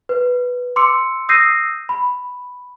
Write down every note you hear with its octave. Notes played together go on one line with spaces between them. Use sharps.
B4
C6 D6 E6 C#7
D#6 E6 G6 A#6 C7 D#7
B5